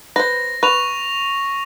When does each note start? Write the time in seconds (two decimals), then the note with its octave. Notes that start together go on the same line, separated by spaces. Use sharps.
0.16 B4 C5 A#6
0.63 B4 C#6 F7